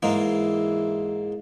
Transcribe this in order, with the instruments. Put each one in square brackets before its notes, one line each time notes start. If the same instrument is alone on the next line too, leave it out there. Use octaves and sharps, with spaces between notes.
[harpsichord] G#2 G#3 A#3 [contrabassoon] E3